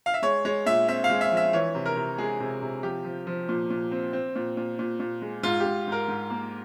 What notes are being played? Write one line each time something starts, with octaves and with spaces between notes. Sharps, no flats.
F5
E5
G#3 C#5
G#3 C#5
A#2 E5
C4 E5
F5
G#3
E5
F3
E5
E3 C#5
C3
A#4
C3
G#3 G#4
C3
C3
F3 G4
F3
F3
A#2
A#2
C4
C4
A#2
A#2
A#2
A#2
G#3
G#2 F4
G4
G#2
G#2 A#4
G#2
A#3